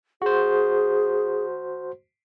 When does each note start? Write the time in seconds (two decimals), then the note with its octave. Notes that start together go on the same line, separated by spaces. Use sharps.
0.22 F#4 G#4 C5